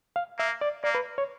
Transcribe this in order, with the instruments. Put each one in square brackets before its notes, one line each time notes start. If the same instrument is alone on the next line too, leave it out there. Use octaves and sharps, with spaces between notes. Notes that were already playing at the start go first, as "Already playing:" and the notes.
[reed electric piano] F5
[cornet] A#3 [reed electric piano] E5
[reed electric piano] D5
[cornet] A#3 [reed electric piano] D5
[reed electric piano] B4
C#5